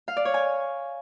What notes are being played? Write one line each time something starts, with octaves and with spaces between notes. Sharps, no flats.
F5
D5
C#5
G#5